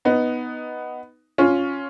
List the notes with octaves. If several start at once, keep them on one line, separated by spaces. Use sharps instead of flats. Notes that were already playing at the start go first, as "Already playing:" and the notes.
B3 D#4
C#4 F4